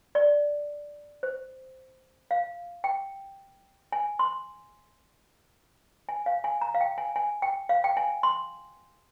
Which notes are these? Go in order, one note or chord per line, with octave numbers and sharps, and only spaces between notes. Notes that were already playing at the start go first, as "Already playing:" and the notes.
D5
C5
F5
G5
G#5
C6
G#5
F5
G#5
A#5
F5
G5
G#5
G#5
G5
F5
G5
G#5
C6